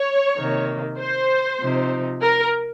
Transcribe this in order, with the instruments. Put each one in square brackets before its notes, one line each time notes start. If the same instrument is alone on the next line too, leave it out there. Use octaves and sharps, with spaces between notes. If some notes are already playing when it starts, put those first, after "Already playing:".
Already playing: [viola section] C#5
[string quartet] C3 D#3 A#3
[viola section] C5
[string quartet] C3 F3 C4 D#4
[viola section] A#4